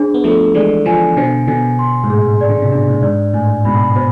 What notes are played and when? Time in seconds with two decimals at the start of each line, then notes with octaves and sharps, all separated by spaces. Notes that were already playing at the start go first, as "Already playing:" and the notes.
Already playing: D4 G#4 C5
0.14 B3
0.24 F3 A3 A4
0.55 E3 G#3 D5
0.85 D3 F3 G#5
1.16 B2 D3 C5
1.48 B2 D3 G#5
1.79 C6
2.04 G#2
2.09 A2 G#4
2.41 D5
2.49 D3
2.62 C3
2.72 B2 D4
2.89 A2
3.03 G#2 D5
3.34 A2 G#5
3.65 G#2 B2 B5
3.96 B2 C5